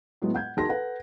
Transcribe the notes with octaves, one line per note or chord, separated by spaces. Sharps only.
A2 F#3 G#3 B3
F#5 G6 G#6
D#3 F#4 G#4 A5 C6 A#6
A4 B4 F#5